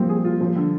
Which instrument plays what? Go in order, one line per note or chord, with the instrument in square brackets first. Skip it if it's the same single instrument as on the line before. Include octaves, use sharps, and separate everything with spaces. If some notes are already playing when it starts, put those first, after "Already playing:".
Already playing: [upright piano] F3 C4 [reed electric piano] G3 A#3
[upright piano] G#4
F4
F3
D3